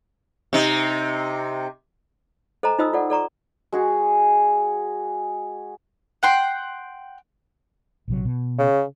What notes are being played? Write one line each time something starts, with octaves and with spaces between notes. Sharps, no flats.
C3 D#4
A4 C5 D#5 G#5 A#5
D#4 F4 C5 D#5 D#6 E6
F4 A4 D5 F#5
A4 D5 A#5 C#6
G#3 F#4 G#4
F#5 G5 C6
A#1 C3 F#3
B2
C#3